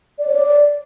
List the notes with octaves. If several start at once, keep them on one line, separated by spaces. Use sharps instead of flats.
D5
C#5
D5